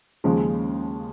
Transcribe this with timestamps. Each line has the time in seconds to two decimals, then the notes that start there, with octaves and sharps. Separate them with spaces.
0.24 D#2 C#3 F3 G#3